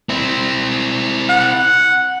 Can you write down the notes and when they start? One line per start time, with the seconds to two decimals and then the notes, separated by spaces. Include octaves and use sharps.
0.09 C4 E4
1.30 F#5